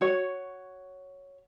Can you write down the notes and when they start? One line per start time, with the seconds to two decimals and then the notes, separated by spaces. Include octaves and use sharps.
0.01 F#4 C#5